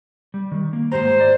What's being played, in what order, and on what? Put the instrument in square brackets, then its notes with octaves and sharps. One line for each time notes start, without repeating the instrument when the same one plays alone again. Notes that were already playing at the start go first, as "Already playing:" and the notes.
[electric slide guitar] G3
D#3
A#3
[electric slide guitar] G#2 G4 A#5 [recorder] C5
[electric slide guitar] D5 F5